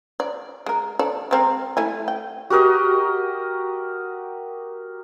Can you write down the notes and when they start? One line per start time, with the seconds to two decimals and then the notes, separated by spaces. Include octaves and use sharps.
0.20 D5
0.66 G#3 A#4
0.99 A4 D5
1.31 G#3 C4 A#4
1.77 A3 E4 G#5
2.08 G5
2.50 F#4 G4 A#4 D#5